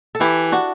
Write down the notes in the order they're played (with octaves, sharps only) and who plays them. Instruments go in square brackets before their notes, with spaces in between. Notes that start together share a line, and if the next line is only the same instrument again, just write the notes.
[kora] A4
[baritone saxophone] E3 [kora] E4 G4
[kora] D4 F#4